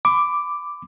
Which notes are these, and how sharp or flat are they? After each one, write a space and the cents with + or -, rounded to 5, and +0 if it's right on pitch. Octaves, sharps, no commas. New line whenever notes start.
B5 +25 D6 +0